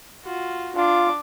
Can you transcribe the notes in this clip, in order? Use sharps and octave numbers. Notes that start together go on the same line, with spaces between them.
F4 F#4
D4 F4 D6